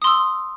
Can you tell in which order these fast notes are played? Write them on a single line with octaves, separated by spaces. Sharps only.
D#6 C6 E6